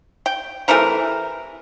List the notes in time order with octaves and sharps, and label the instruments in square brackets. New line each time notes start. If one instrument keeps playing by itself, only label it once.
[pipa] G5
C3 E3 A3 A#4